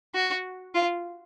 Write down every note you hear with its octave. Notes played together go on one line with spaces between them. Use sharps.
F#4
F4